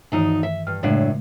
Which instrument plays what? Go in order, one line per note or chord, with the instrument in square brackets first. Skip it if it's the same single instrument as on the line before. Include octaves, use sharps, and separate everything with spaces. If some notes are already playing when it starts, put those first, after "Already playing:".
[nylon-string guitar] D2 D#4 [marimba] G2 D#3 E3
[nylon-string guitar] E5
[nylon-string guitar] G2 [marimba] F6
[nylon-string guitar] F#2 A2 D4 [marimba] C#3 G#3 A3